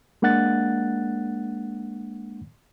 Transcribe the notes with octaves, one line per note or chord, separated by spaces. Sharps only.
G#3 A#3 D4 F#5 F#6 A6